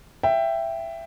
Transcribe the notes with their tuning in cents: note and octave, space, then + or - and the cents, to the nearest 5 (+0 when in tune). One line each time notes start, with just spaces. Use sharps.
E5 +15 G5 +0